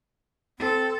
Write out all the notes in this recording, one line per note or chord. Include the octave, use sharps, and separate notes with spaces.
C4 A4